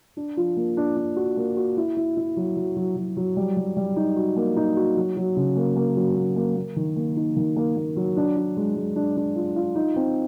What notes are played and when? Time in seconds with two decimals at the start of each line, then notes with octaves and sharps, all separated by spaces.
0.17 D4
0.37 F3
0.57 A#3
0.77 D4
0.97 D4
1.16 F#4
1.37 A#3
1.57 F#4
1.77 E4
1.97 E4
2.17 E4
2.37 F#3
2.56 F#3
2.76 F#3
2.96 F#3
3.17 F#3
3.37 G3
3.57 G3
3.77 G3
3.96 D#4
4.16 F#4
4.36 A#3
4.57 D#4
4.77 F#4
4.97 F#3
5.17 F#3
5.36 C#3
5.56 A#3
5.76 A#3
5.96 F#3
6.16 A#3
6.36 A#3
6.56 A#3
6.76 D#3
6.96 A#3
7.16 D#4
7.36 D#3
7.56 A#3
7.77 A#3
7.96 F#3
8.17 D4
8.36 D4
8.57 G#3
8.76 G#3
8.96 D4
9.16 D4
9.36 F4
9.56 F4
9.75 D#4
9.96 C4